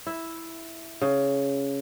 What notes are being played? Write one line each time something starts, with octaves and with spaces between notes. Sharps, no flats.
E4
C#3